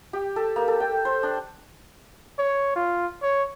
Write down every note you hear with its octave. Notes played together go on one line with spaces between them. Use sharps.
G4
A4
A#3
A4
G5
C5
D4
C#5
F4
C#5